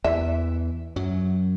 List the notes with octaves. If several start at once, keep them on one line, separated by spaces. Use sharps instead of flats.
E2 E3 E5
F#2 F#3